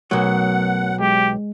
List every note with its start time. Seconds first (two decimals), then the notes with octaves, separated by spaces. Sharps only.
0.11 B1 F#3 A3 A#4 F#5
1.00 G#3 G4